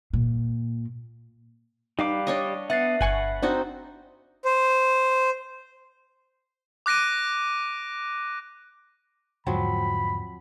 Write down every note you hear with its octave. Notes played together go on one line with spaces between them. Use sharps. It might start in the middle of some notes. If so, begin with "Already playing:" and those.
A#2
G3 D#4 B4 F5 D6
D4 C#5 D#5
B3 E5 F#5 A6 C7
G1 B4 F#5 G#5 C#6
C4 D4 D#4 F#4
C5
D6 F#6 A#6 D7 D#7
E2 G#2 D3 F3 F#3 C4 B5